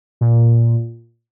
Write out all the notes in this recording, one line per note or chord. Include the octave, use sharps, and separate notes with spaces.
A#2